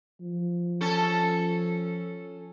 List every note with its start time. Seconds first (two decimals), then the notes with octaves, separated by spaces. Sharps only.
0.21 F3
0.81 C#4 A4